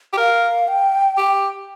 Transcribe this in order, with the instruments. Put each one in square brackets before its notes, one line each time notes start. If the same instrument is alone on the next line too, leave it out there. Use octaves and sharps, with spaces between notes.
[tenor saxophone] G4
[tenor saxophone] A#4 [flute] F5
[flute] G5
[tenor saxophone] G4